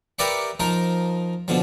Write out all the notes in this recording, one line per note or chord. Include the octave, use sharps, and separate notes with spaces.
G4 A#4 B4 D5 E5 F#5
F3 D#4 A#4
B2 D3 F3